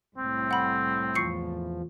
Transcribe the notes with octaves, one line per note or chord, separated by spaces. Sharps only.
C2 A2 C4
F#5 B5
E2 F3 C#6 C7 C#7